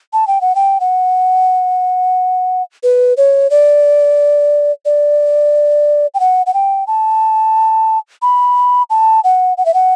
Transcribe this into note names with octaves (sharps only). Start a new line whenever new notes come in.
A5
G5
F#5
G5
F#5
B4
C#5
D5
D5
G5
F#5
F#5
G5
A5
B5
A5
F#5
F#5
E5
F#5